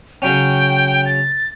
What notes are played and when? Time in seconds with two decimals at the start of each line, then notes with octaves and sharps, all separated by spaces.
0.22 C#3 F#3 C#4 G5
1.05 A6